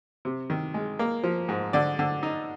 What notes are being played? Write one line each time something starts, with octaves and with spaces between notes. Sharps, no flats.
C3
D#3
G#3
A#3
F3
G#2
D3 D5
D3
D#4